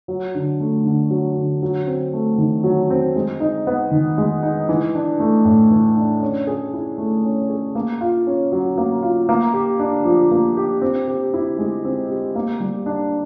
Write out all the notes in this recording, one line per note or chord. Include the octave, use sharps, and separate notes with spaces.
F#3
D3
A3
D3
F#3
D3
F#3
C4
A3
D#3
F#3
C4
G#3
D#4
B3
D#3
G#3
D#4
E3
D4
A3
A2
E3
D4
C#4
G#4
E4
A3
C#4
G#4
A#3
F4
C#4
F#3
A#3
F4
A#3
G4
D4
F3
A#3
G4
C4
G4
E4
G#3
C4
G4
A#3
G3
D4